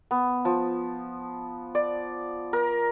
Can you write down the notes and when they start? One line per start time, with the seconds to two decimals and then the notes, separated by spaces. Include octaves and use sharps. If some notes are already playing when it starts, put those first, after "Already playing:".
0.11 B3
0.45 F3
1.75 D5
2.53 A#4